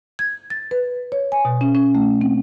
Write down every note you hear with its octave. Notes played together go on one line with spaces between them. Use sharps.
G#6
A6
B4
C#5
G#5
B2
C#4
C#4
A3
C4